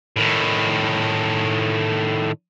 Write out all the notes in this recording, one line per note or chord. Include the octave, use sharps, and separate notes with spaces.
A2 D#3